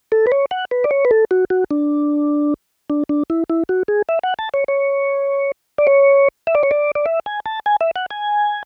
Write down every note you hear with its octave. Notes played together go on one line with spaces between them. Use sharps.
A4
B4
C#5
F#5
B4
D5
C#5
B4
A4
F#4
F#4
D4
D4
D4
E4
E4
F#4
G#4
E5
F#5
A5
C#5
C#5
D5
C#5
E5
D5
C#5
D5
D5
E5
G#5
A5
G#5
E5
F#5
G#5